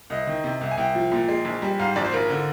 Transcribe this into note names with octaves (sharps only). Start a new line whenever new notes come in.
C2 D#5
D#3
C3
C2
G#5
C2 G5
F3
A#2
G#3
A#1
G3
G#2 F5
A#1 D5
C5
G#1 A#4
D3